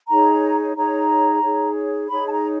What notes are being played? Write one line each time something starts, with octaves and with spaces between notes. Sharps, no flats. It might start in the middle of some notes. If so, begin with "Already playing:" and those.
D#4 G#4 C#5 A#5
D#4 G#4 C#5 A#5
D#4 G#4 C#5
D#4 G#4 C#5 B5
A5
A#5